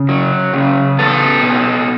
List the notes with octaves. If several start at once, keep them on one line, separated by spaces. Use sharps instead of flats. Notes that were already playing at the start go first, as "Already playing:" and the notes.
Already playing: C#3
F#3
C#3
B3 A4
B2